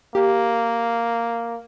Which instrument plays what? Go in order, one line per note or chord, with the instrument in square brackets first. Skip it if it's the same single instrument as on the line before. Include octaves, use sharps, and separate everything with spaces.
[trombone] A#3 [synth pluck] G4